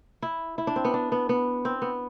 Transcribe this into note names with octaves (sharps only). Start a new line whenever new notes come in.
E4
E4
D4
C4
B3
D4
B3
B3
C4
B3